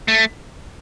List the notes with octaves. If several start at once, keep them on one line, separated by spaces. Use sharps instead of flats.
A3